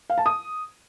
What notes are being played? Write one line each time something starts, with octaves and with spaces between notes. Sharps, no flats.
F5
A5
D#6